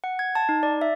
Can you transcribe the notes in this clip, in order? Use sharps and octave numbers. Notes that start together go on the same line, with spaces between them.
F#5
G#6
A5
D#4
D5
E5